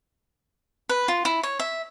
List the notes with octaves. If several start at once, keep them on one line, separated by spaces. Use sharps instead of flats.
B4
F4
E4
C#5
E5